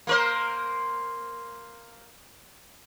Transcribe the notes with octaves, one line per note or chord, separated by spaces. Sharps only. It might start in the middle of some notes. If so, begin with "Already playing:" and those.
A#3 A#4 C5